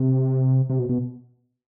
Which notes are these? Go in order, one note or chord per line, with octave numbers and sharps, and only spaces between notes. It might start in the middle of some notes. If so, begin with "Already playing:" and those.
Already playing: C3
C3
B2
B2